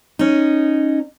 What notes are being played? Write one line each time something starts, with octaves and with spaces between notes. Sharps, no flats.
C#4 D#4